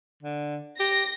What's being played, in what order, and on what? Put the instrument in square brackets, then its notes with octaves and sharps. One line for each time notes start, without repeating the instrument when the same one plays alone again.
[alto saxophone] D3
[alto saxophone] G4 [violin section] A#6